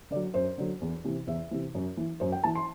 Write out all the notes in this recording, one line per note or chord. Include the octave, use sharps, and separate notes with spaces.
D3 D5
F#3
F#2 C5
D3 F#3
E2
C3 E3
E2 E5
C3 E3
F#2
E3
F#2 C5
G5
E3 A5
C6